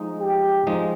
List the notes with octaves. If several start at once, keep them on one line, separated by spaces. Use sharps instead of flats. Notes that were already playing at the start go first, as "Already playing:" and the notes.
Already playing: F3 G#3 D#4
G4
F3 G#3 D#4